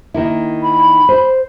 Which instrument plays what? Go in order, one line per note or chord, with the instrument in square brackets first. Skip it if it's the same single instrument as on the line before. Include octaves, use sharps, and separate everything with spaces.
[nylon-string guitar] D#3 A#3 E4
[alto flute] B5
[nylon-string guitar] C5